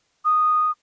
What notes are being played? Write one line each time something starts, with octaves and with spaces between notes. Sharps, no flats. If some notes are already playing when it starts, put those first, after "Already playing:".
D#6